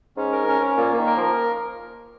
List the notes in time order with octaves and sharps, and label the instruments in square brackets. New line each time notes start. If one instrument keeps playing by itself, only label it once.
[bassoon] G#2 [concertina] C#4
[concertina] A#4
C#4
C#4
[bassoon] A#2 [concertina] A#3
[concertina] A#3
[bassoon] D#3
[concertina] A#4
[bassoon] F3 [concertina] A#4